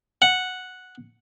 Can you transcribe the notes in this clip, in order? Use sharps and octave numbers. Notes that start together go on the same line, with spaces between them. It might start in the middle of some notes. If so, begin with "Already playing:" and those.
F#5